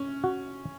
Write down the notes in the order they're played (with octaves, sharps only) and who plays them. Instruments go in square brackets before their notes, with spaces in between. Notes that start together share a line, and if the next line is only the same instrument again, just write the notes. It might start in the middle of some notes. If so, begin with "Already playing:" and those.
Already playing: [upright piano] C#4
[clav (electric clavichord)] F#4